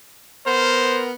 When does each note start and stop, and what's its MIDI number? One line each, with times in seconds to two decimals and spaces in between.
0.46 1.12 59
0.46 1.12 70
0.46 1.03 72